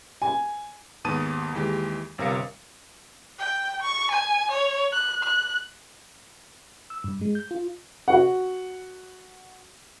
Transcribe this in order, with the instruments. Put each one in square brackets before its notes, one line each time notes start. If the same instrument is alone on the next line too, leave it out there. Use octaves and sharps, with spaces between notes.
[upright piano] G#5
[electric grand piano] D#2 G#2 B3 A5 D#6 D#7
D#2 E3 G#3 G4
G1 C3 A#4 F5 C#7
[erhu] G5
C#6
G#5
C#5
F#6
F#6
[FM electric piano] E6
G2
G#3
G6
F4
[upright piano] F#4 F#5